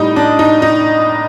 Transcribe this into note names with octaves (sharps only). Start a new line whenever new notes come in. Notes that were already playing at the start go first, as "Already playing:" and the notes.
Already playing: A2 G3 D#4
D4
D#4
D#4